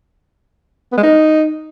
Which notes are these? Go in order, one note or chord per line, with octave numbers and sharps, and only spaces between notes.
B3
G#3
D#4